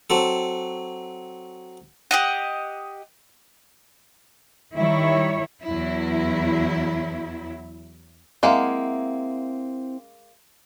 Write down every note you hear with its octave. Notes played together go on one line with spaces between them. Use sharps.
F#3 C4 A4
G4 D#5 F#5
D#3 G3 E4 C#5
E2 F#3 E4
G#3 A#3 C4 E4 F#5